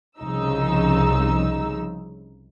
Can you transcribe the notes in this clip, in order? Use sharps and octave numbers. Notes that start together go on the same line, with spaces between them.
C2 C#3 F3 D#4 E6